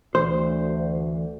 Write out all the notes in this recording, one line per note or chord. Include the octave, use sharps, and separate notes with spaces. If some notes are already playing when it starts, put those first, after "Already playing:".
D2 E3 C5